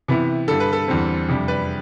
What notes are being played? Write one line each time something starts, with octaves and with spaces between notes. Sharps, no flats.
C3 E3 B3 E4
G2 D3 G3 A4
B4
A4
E2 D3 G3 C4
F2 C3 G3 D4
B4 D5